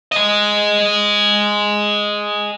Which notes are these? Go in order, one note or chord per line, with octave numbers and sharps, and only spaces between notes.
G#4 D#5